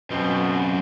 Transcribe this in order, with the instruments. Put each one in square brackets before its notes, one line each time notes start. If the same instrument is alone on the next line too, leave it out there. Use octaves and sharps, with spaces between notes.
[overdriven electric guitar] F#2 C4 [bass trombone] B2